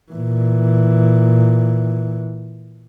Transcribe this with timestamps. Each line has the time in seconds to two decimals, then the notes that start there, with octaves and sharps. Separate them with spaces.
0.12 A#2 E3